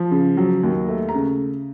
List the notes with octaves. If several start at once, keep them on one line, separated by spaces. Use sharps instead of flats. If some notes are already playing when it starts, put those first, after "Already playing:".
Already playing: F3
C#3
F#3
D#2
A3
A#5
C#3